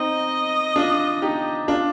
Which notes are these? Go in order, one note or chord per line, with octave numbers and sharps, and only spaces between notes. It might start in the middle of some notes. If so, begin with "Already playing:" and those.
Already playing: C4 D#4 D#5
D4 F4
D#4 G4
D4 F4